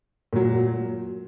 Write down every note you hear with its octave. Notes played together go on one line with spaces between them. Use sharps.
A#2 F#3